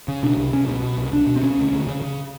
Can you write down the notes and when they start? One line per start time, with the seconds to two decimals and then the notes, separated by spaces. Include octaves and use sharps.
0.08 C#3
0.23 B2 D4
0.37 C2
0.53 C2 C#4
0.68 B2
0.82 B2
0.98 C2
1.12 C2 D4
1.27 B2
1.36 C4
1.42 C#3 C#4
1.58 D2
1.72 D2
1.87 C#3
2.02 C#3